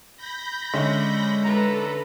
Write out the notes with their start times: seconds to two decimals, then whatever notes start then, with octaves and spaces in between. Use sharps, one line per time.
0.17 B5 G6 A#6
0.74 D3 G#3 C#4 E5
1.43 A4 B4 A#5